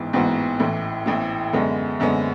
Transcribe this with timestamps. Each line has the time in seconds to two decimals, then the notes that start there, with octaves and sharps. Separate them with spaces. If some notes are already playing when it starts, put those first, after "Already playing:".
Already playing: A1 G#2 E3 B3
0.13 A1 G#2 E3 B3 F#4
0.59 A1 A2 E3
1.06 A1 A2 E3
1.53 F#2 D3 G#3 B3
2.00 F#2 D3 G#3 B3